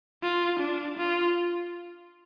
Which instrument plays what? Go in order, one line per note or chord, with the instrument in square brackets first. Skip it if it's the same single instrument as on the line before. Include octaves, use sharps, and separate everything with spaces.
[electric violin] F4
D4
F4